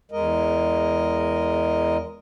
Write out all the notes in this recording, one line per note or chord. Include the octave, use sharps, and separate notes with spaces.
E2 G#3 A#4 D#5